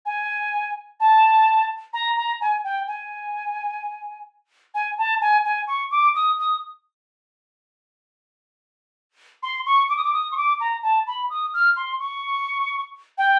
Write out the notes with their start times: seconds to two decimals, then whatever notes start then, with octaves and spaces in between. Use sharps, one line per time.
0.06 G#5
1.00 A5
1.93 A#5
2.17 A#5
2.41 G#5
2.64 G5
2.87 G#5
4.75 G#5
4.98 A5
5.21 G#5
5.45 G#5
5.68 C#6
5.91 D6
6.15 D#6
6.39 D#6
9.43 C6
9.66 C#6
9.89 D6
9.97 D#6
10.04 D6
10.14 D#6
10.32 C#6
10.37 D6
10.60 A#5
10.83 A5
11.07 B5
11.30 D#6
11.54 F6
11.77 C6
12.00 C#6
13.18 G5